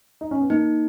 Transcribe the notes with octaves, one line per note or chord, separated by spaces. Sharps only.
D#4
C#4
B3
A#3 D#4